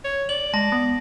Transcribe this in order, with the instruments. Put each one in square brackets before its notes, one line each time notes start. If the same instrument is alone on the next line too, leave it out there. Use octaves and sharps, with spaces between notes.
[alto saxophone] C#5
[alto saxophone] D5 [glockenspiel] F#7
[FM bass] G#3 [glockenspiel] A5 A#6
[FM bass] B3